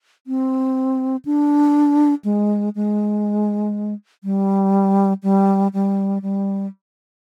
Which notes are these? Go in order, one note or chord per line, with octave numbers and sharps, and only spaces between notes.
C4
D4
G#3
G#3
G3
G3
G3
G3